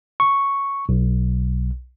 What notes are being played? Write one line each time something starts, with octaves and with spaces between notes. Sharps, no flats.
C#6
B1